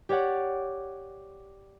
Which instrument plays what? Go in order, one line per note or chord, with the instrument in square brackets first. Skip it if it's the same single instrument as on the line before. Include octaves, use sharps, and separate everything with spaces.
[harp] G4 C#5 D5 F#5